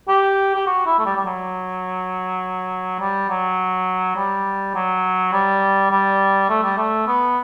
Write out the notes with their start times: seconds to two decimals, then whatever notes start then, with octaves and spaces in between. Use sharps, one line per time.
0.08 G4
0.55 G4
0.66 F#4
0.86 E4
0.99 A3
1.05 G3
1.16 G3
1.25 F#3
2.99 G3
3.29 F#3
4.16 G3
4.74 F#3
5.32 G3
5.91 G3
6.49 A3
6.63 G3
6.77 A3
7.07 B3